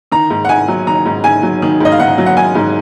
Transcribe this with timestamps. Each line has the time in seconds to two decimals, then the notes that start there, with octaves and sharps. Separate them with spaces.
0.12 D#3 A#5
0.30 G#2
0.45 F#5
0.49 G#2 G#5
0.68 F#3
0.87 D#3 A#5
1.06 G#2
1.24 G#2 G#5
1.43 F#3
1.62 D#3
1.80 G#2 D#5
1.92 F5
2.00 G#2 F#5
2.18 F#3
2.26 F#5
2.37 D#3 G#5
2.55 G#2